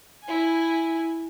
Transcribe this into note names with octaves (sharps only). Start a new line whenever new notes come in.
E4 G#5